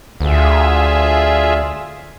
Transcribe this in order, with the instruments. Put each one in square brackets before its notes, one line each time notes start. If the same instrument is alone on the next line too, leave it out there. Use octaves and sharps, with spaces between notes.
[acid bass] D2 [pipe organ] F4 G#4 E5